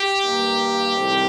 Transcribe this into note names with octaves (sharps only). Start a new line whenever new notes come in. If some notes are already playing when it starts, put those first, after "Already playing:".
Already playing: G4
G2 D#3 A#3 D#4
C2 C3 D#3 A3 C4